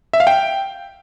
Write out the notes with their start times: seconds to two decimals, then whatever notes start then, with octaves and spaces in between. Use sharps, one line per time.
0.13 E5
0.20 F5
0.27 G5